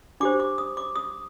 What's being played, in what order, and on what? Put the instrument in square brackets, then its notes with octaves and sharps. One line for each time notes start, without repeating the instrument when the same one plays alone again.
[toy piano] D4 G4 C5 D6
D6
D#6
D6
D#6